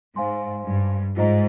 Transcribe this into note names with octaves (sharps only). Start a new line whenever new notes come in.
G#2 C5 F5 G#5 C6
G2
G#2 F4 C5 D#5 A#5